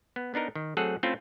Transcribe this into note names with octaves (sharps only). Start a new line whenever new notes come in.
B3
B3 D4 D#4 A#4
D#3
F#3 A3 C4 G#4 A4 F#5
A3 C4 C#4 E4 F4 A4